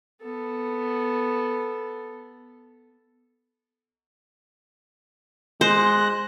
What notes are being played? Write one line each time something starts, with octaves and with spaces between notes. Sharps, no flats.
B3 A4
G#3 C5 F#6 A#6